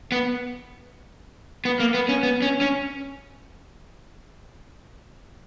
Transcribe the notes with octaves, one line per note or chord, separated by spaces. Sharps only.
B3
B3
A#3
B3
C#4
B3
C#4
C#4